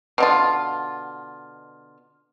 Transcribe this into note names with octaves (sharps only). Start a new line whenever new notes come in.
B2 D3 F4